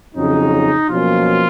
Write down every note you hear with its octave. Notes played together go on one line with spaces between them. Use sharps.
F2 C#3 F#3 C#4 D#4
B2 F3 F#3 A#3 C#4 F4